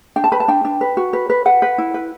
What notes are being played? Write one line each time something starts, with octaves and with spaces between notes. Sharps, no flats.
D4 G5
A5
B4 B5
A5
D4 G5
D4
B4
F#4
B4
B4
B4 F#5
B4
E4
B4